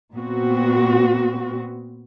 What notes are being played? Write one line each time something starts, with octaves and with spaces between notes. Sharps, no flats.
A#2 B3 C4 F#4